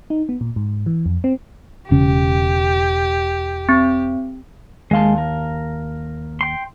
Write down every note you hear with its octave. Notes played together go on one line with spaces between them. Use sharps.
D#4
B3
A#2
G#2
E3
F2
C4
E1 C#3 C#4 G4
C4
D#2 G#3 F5 A5 C6
A#4
G5 C6